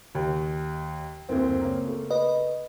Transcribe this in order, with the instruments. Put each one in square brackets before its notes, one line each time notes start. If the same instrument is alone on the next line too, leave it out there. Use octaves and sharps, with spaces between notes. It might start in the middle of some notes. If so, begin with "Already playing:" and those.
[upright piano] D#2
[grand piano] F#1 D2 [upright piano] C4
[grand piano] C#3 A#3
[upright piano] A3
[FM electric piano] B4 D#5